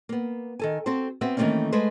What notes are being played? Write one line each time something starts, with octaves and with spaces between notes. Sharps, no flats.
A#3 B3
D#3 A4 G#5
C4 F#4 A4 C5
B3 C4 F#4 E5
D#3 E3 A3 A#3 C4 C#4
G#3 A3 B4 C5